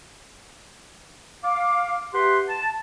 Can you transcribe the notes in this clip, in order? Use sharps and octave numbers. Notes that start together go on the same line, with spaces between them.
F5 D6
G4 B4 E5 F#5 C6
A5